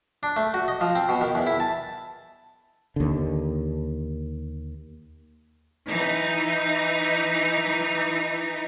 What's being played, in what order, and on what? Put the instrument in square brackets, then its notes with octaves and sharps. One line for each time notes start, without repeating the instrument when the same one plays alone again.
[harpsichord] D4
A3
F#4
D#5
F3
C4
B2
D#3
E2
E4
A5
[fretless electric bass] D#2 D3
[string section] E3 D#4